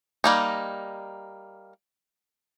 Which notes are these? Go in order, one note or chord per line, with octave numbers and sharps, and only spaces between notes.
G3 A#3 D#4